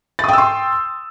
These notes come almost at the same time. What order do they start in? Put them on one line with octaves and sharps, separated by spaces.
A6 D#6 G5 E6 C6